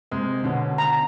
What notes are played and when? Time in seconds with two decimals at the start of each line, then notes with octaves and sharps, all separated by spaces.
0.11 C3 G#3
0.43 B2 D3 C#4
0.78 A#5